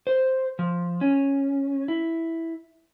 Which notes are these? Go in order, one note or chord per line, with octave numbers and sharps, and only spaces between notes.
C5
F3
C#4
E4